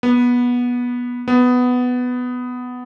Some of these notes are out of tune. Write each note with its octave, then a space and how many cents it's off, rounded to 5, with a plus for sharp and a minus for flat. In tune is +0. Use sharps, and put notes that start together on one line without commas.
B3 -15
B3 +10